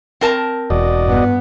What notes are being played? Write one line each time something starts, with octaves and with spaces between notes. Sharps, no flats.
C4 A#4 A5
E1 F#4 D5 D#5
G2 B3